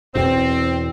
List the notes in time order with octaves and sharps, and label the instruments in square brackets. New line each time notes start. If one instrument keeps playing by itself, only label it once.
[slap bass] E2 B2 [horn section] C4